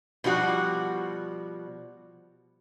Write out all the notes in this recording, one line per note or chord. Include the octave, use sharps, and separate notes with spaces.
B2 F3 G3 F#4